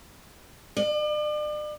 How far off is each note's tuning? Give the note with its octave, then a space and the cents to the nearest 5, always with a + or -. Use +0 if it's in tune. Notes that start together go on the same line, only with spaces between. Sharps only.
D5 +40